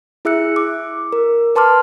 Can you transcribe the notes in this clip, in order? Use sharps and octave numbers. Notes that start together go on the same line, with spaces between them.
E4 G#4 E5 E6 F#6 C#7
D6
A#4
B4 A5 C6 D6 F6